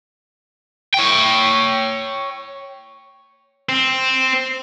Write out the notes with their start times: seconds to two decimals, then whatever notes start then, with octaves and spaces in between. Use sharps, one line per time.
0.94 C#5 G5
3.69 C4